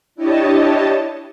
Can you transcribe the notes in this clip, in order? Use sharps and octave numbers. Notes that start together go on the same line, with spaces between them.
D4 E4 G4 C#5 D#5 A5